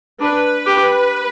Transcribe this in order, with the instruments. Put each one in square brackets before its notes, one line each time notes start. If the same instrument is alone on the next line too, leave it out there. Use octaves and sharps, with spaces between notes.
[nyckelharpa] D4 [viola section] B4
[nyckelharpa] G4